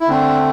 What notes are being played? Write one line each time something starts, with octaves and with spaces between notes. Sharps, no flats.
E4
D3 A3 C4 D4